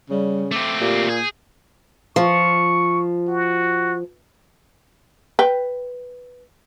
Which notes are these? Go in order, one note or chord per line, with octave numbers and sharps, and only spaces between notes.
C#3 G3
A3 C4 D6
A#2 G4
G#4 G6
F3 C#6
F#4
B4 G5